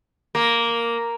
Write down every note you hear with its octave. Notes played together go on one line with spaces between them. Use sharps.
A#3